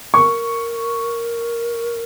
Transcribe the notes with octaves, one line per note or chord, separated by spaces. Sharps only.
A#4 C#6